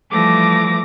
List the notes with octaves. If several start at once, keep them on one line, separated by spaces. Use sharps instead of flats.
E3 F3 G3 A3 D6 A#6